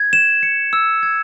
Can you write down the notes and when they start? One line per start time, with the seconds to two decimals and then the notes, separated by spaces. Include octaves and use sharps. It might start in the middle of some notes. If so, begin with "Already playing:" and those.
Already playing: G#6
0.13 E7
0.43 C#7
0.73 E6
1.03 G#6